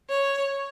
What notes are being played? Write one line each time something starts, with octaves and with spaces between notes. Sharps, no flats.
C#5